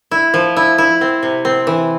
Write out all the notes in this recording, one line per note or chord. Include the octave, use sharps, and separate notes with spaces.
E4
F3
E4
E4
C4
C3
C4
E3